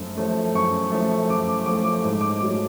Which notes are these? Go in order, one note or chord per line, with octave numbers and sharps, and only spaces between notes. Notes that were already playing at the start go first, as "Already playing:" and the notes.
Already playing: F#2 F3 A3
F3 A3
F#2 C#6
F3 A3
F#2 D6
D6
F3 A3 D6
D6
G#2 D6
D6
F#3 A3 D6